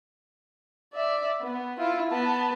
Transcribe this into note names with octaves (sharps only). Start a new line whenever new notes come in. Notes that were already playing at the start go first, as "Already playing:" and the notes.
D5 E5
B3
E4 F4
B3 A5